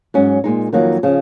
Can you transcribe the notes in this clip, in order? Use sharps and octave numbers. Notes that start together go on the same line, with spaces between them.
G#2 F#3 C#4
A#2 G#3 D#4
F2 D#3 F#3 A#3
C#3 F3